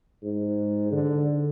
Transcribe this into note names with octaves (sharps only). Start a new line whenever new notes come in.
G#2
D3